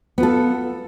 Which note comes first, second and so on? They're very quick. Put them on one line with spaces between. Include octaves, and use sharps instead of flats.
B3 F4 A4